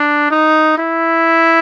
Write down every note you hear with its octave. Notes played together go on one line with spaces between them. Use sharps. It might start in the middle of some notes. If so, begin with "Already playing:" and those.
Already playing: D4
D#4
E4